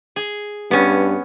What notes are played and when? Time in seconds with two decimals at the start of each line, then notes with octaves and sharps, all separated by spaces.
0.16 G#4
0.71 G2 B3 C#4